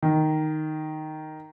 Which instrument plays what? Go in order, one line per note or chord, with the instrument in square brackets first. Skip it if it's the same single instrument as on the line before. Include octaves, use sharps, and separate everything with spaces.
[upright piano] D#3